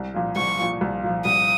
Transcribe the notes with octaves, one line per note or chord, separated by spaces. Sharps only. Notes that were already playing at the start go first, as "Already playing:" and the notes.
Already playing: C2
A#2 F3
C2 C#6
A#2 F3
C2
A#2 F3
C2 D#6